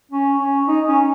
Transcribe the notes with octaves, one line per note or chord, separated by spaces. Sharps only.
C#4
C#4
D#4
C#4